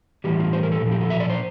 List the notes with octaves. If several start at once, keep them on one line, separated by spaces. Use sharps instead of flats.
A2 E3 G3 G4
F4
C5
A#4
A4
A#2 F3
G4
A4
E5
D5
C5